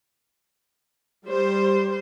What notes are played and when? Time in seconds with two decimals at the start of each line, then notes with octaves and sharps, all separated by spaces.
1.25 G3 C5